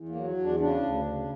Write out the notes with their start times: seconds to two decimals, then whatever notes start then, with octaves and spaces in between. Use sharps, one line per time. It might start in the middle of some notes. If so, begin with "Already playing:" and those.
Already playing: E2
0.09 A#3
0.15 F#3
0.38 E2 D4
0.60 C#3 D4
0.83 D2
1.06 C#3